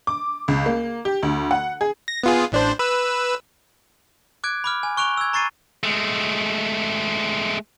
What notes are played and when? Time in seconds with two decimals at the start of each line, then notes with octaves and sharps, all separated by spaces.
0.07 D6
0.48 C#2
0.66 A#3
1.05 G4
1.23 D2
1.51 F#5
1.81 G#4
2.08 A#6
2.23 B3 F4 G#4
2.52 A1 D4 C5
2.79 B4 E6
4.44 D6 F#6 G#6 D7
4.64 B5 D6 F6
4.83 G#5
4.97 C#6 F#6 D7 F7 G7
5.17 E6 G#6
5.33 A#5 C#6 A6 C7 D#7
5.84 G#3 A3